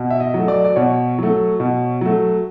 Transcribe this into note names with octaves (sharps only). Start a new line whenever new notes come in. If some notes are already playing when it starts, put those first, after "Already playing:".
Already playing: B2
E5
D#5
F#3 A3
D5
D5
B2 C#5
F#3 A3
B2
F#3 A3